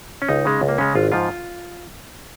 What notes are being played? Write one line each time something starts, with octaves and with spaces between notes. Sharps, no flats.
C#4
C#2 D#4
C#3 G#3
C#2
A#3
C#3 G#3 C#4
G#1 F4
G#2 F3 F4